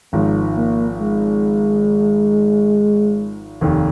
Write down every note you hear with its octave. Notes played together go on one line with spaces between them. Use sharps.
G#1 G#2 F3 G#3
A#3
G#3
F1 D#2 D#3